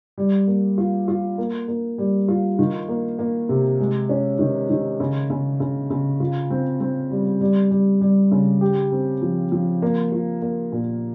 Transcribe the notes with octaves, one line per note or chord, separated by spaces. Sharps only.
G3
A#3
F4
F4
A#3
A#3
G3
F4
D#3
A#3
A#3
C3
G#3
C#4
D#3
D#3
C#3
C#3
C#3
C#3
F4
C4
C4
G3
G3
G3
G3
C#3
G4
C4
F3
F3
A#3
F4
A#3
A#2